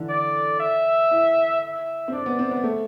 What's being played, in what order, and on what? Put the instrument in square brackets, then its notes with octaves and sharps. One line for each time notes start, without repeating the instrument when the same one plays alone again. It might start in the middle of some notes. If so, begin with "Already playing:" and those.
Already playing: [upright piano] D3 E3 D4
[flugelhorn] D5
E5
[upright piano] E4
[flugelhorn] E5
[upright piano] C4
[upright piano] D4 [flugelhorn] D5
[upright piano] B3
C4
B3
A3